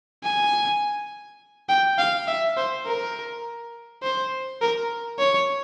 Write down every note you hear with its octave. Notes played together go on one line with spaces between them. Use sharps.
G#5
G5
F5
E5
C5
A#4
C5
A#4
C#5